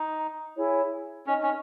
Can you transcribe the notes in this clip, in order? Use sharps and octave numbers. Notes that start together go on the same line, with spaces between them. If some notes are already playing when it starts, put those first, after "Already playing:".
Already playing: D#4
E4 G#4 C#5 G#5
C#4 D#4 A4 D#5
C#4